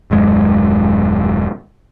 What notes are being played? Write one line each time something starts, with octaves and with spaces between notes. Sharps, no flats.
D#1 F#2 G#3